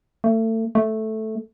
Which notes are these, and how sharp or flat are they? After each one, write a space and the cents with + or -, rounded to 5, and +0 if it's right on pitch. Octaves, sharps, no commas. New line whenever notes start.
A3 +30
A3 -5